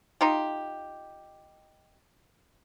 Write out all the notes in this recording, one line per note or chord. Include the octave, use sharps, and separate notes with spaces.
D#4 F4 G4